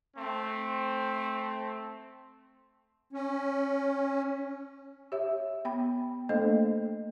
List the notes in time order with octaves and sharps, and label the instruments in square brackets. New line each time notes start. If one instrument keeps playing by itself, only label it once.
[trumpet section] A3 C4
[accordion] C#4
[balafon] G4 C#5 E5
B3 G5 B5
A3 A#3 D4 A4 C5 D#5